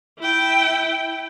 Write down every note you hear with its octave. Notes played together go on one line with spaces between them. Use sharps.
E4 G5